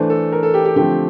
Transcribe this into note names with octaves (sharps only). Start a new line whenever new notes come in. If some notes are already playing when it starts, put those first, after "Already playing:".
Already playing: E3 A3 D4 C5
A4
A#4
A4
G4
G4
D3 F3 A3 C4 G4